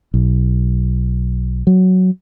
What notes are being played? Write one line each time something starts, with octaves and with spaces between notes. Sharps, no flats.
B1
F#3